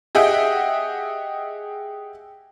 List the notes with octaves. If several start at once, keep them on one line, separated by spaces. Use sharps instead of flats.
G4 G#4 D#5 E5 F#5 G5